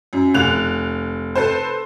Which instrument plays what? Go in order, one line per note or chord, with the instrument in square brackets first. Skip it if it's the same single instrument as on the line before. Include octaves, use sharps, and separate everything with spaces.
[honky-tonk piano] F#2
F1 F#6 F7
A4 B4 C5